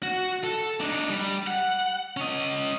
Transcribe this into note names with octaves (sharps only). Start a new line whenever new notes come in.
F#4
A4
D4 D#4
G3
F#5
C#4 D#5